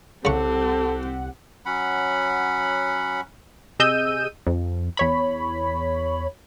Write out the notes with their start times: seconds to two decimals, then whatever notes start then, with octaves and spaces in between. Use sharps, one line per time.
0.25 C2 C#3 C4 G4 A4 F#5 C#6
1.66 F#3 C#4 F#5 B5
3.79 C3 G#4 D#5 E6 G6 D#7
4.47 F2
4.97 E2 C#5 B5